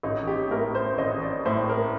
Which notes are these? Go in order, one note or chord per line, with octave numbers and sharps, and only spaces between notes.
A1 D#4
G4
A2 A#4
C5
A1 D#5
D5
A2 C5
A#4